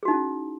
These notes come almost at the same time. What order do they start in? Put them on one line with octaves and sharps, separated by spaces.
G#4 F#4 D#4 E4 C#4